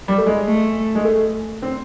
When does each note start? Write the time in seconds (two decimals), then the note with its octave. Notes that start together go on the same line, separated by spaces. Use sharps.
0.08 G3
0.18 A3
0.26 G#3
0.46 A3
0.95 G#3
1.05 A3
1.62 C4